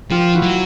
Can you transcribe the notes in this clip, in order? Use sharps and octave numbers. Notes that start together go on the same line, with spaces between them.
F3 F4 G4
E4 F#4
F#3